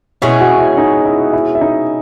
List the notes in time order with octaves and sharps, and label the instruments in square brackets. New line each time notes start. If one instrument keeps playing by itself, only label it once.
[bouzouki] B2 G#3 C#4 G#4 [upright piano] E4 E5
[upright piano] F#4 F#5
E4 E5
D#4 D#5
E4 E5
E4 E5
E5
D#4 D#5